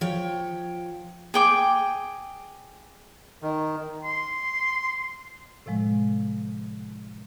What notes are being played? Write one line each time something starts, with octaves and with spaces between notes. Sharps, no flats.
F3 C#5 G5
G#4 G5 D6
D#3
C6
A2 C3 F3 G#3